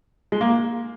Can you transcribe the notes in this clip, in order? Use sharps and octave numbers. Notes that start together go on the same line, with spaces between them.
G#3
A#3